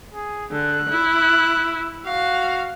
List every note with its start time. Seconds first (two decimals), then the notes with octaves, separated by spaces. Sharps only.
0.14 G#4
0.51 D3 F#6
0.89 E4
2.06 F#4 F5